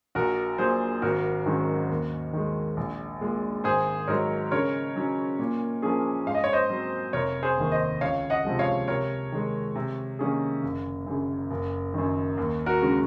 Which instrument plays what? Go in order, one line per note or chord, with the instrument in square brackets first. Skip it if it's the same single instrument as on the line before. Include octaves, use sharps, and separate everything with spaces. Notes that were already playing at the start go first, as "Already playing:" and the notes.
[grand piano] A#1 [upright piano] F#4 A#4
[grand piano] A#2 F#3 [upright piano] G#4 C5
[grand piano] G#1 [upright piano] F#4 A#4
[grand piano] G#2 D#3 F#3 C#4
D#2
D#3 G#3
A#1
A#2 G#3
[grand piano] G#1 [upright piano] G#4 C5
[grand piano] G#2 F#3 [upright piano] A#4 C#5
[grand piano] C#3 [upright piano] A#4 C#5
[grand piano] F#3 C#4
A#2
F3 A#3 C#4 G#4
[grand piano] G#2 [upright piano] F5
[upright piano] D#5
C#5
C5 D#5
[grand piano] F#3 C4
[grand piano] F1 [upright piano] A#4 C#5
[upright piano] G#4 C5
[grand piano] D#2 D#3
[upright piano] C5 D#5
[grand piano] C#2 [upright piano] C#5 F5
[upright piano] D#5 F#5
[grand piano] C3 F3 G#3
[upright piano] C#5 F5
[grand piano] C3 [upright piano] A#4 C#5
[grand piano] D#3 G#3
C3
D#3 A#3 C#4 G#4
F#1
F#2 C#3
F#1
F#2 D#3
D#2
[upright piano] F#4 A#4
[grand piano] C#3 G#3 C#4